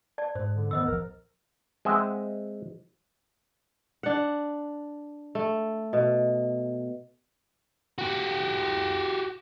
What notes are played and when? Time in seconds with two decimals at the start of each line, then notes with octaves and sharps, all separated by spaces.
0.18 D5 A5
0.35 G#2 C5
0.55 D3
0.71 A2 D#3 B3 C5 D#5 E6
0.86 D1 A#1 F3 A#4
1.85 G#3 C4 D#5 E5 F#5
4.03 D4 F#5
5.35 A3
5.93 B2
7.98 F#4 G4